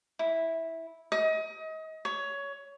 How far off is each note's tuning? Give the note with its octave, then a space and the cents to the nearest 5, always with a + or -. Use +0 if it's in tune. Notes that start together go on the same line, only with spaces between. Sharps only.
E4 -10
D#5 +30
C#5 +15